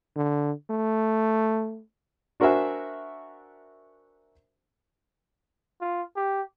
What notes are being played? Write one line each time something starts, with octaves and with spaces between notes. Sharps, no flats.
D3
A3
D4 F#4 A#4 C5 E5 G#5
F4
G4